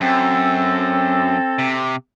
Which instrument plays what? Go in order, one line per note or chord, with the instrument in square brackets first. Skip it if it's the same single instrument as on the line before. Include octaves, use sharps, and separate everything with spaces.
[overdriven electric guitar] F#2 [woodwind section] C4 A4
[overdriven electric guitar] C3